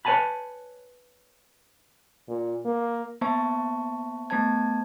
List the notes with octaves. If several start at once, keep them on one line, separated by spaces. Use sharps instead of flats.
B4 C#5 E5 G#5 A5 B5
A#2
A#3
A#3 B3 C5 E5 A5 C#6
A3 B3 C5 A5 G#6